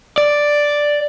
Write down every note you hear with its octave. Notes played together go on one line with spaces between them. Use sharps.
D5